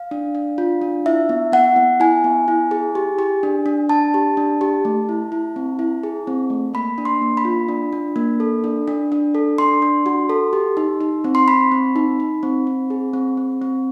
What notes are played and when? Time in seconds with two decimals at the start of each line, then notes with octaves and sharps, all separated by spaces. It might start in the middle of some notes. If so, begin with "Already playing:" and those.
Already playing: F5
0.11 D4
0.35 D4
0.58 F4
0.81 D4
1.06 E4 E5
1.29 B3
1.52 B3 F#5
1.76 B3
2.00 E4 G#5
2.24 B3
2.48 E4
2.71 G#4
2.95 G4
3.19 G4
3.43 D4
3.66 D4
3.89 D4 A5
4.14 G4
4.37 D4
4.61 G4
4.85 A3
5.09 E4
5.32 E4
5.56 C4
5.79 E4
6.03 G#4
6.27 C4
6.50 A3
6.74 A#3 B5
6.98 D4
7.05 C6
7.22 A#3
7.37 B5
7.45 F4
7.68 D4
7.93 D4
8.16 A#3
8.40 A4
8.64 D4
8.88 D4
9.12 D4
9.35 A4
9.58 D4 C6
9.82 D4
10.06 F#4
10.30 A4
10.53 G4
10.77 D#4
11.01 D#4
11.24 C4
11.35 C6
11.48 C4 B5
11.72 C4
11.96 D#4
12.20 D#4
12.43 C4
12.67 C4
12.90 G#4
13.13 C4
13.37 C4
13.62 C4